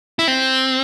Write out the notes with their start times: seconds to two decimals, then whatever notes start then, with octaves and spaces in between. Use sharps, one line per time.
0.19 E4
0.28 C4